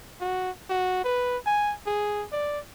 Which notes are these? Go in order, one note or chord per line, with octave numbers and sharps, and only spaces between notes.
F#4
F#4
B4
G#5
G#4
D5